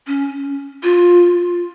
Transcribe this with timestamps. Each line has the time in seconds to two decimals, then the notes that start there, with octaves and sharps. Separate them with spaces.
0.07 C#4
0.83 F4